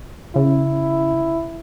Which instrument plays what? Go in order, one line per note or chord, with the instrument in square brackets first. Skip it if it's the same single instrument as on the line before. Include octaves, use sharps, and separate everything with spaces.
[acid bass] C#3 [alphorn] E4